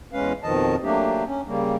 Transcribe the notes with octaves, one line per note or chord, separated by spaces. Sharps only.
E2 G#3 C#4 B4 F5
F2 B2 D#3 F3 D#5 A5
F#3 A3 A#3 D4 G4
C#4
C#3 G3 A#3